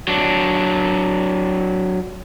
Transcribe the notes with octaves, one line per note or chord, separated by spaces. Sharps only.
F#3 D4